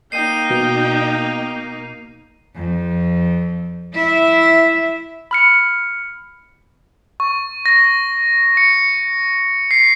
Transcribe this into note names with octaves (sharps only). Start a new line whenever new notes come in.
A#3 D#4 D#5 G5 C7 D#7
B2
F2
E4 E5
B5 F6 C#7
C#6
A#6
C#7
C7